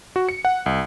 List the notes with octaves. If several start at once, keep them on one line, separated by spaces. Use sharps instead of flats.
F#4
C#7
F#5
C2